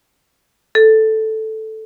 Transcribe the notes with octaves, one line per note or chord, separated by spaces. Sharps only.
A4